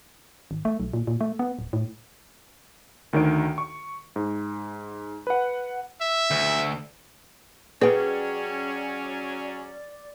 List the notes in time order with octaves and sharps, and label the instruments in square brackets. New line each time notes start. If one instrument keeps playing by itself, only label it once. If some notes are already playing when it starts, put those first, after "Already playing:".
[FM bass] G#1
A3
B1
A#2
A#2
A3
B3
D1
A2
[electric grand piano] D2 D#3 C#5 D7
C#6
G#2
B4 F#5
[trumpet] E5
[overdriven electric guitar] D2
[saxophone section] F#3 C#4 [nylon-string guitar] G#4 G5 [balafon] B4 [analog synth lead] D5